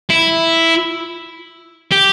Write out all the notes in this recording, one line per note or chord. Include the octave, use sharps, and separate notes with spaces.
E4
G4